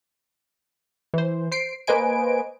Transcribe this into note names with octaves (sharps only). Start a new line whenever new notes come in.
E3 C5
C5 C7 D7
A#3 B4 C5 D#5 G#5 D7